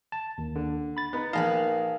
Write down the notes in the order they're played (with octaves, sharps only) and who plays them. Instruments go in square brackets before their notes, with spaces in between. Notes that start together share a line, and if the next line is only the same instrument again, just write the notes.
[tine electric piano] A5
D#2
[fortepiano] D3
[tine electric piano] B5 A6
[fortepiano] B3 D#4
[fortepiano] A#1 A5 [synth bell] D#4 A#4 B4 [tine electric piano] F5 G#5